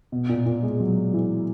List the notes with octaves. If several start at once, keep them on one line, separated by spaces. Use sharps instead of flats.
B2
A#2
A#2
G#3
F#3
E3